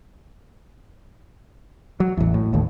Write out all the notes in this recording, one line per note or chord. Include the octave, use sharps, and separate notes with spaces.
F#3
A1 E2
A2
G1 D#2 A2